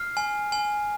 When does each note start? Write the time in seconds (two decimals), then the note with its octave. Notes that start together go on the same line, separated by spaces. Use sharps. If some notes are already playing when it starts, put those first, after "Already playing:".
Already playing: F6 C7
0.17 G#5
0.52 G#5